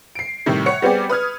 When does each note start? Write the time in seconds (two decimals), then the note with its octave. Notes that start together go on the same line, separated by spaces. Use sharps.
0.15 C7 D7
0.46 A2 C3 D#3 G3
0.66 C#5 F#5 C#7
0.82 G3 B3 C4 G4 G#4 D5
1.10 B4 D#6 F6 G#6